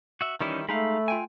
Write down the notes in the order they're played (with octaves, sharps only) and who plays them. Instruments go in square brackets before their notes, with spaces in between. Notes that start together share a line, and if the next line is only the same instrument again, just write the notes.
[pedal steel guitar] F#4 E5
[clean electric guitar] D#3 G3 E4 [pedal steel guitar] E3 C#4 D#4
[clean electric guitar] G#3 D#4 F5 [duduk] A3 [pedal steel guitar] B5
[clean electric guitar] F4 G5 G#5